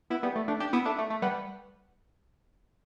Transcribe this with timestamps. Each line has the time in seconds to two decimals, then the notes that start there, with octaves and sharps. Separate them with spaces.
0.10 B3 E4
0.23 G3 B3
0.36 A3
0.48 A3 D4
0.60 D4 G4
0.73 B3 E4
0.85 A3 D4
0.99 A3
1.10 A3
1.22 G3 B3